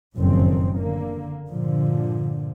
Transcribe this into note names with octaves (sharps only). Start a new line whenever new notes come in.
F#1 F2 A2 C3 D#3 C4
D3 A#3
G2 A#2 D3 F3